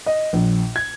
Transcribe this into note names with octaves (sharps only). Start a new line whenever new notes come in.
D#5
A#1
G#6